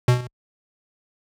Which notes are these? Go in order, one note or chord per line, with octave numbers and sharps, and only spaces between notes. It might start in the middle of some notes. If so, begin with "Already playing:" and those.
B2